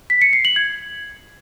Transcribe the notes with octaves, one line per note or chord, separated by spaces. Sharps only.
B6
C#7
C7
F#7
G#6